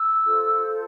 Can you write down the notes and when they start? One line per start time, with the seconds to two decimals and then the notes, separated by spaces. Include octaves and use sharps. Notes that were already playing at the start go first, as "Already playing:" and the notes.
Already playing: E6
0.24 F4 A4 C5